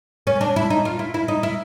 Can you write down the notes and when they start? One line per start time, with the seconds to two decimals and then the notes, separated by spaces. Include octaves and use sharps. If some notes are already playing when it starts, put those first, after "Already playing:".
0.27 C#4
0.41 D4
0.56 E4
0.70 D#4
0.85 F4
0.99 E4
1.14 E4
1.28 D#4
1.43 E4